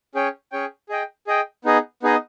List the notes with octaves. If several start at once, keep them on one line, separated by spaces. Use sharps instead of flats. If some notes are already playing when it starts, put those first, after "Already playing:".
C#4 G#4 C#5 G5
C#4 G#4 C#5 G5
G#4 D#5 G5
G#4 D#5 G5
B3 D#4 G#4 D#5
B3 D#4 G#4 D#5